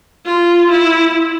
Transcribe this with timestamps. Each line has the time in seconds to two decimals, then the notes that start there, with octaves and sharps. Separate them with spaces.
0.26 F4
0.71 E4